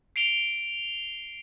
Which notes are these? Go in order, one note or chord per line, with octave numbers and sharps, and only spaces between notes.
C7 D7 F7 G7